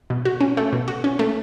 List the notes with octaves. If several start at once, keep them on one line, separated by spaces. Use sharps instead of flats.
B2
F#4
C#4
A3
B2
F#4
C#4
A3